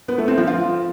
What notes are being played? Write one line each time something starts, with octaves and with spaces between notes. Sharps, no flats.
B3
A3
C4
F3
F4